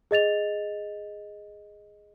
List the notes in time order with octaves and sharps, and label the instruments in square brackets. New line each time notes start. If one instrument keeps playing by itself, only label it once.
[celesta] G#4 D#5 A6 F7